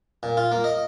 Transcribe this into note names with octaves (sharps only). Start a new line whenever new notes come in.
A#2
F4
A#3
D#5